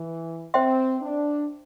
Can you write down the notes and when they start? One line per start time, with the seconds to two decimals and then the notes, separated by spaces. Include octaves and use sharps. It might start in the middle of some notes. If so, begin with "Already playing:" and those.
Already playing: E3
0.54 C4 C5 E5 G5 C6
1.02 D4